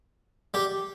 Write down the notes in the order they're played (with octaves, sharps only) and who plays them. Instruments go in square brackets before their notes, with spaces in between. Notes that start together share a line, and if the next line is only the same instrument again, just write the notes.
[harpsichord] G3 G4